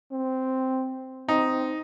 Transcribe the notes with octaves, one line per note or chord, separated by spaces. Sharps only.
C4
C4 D#4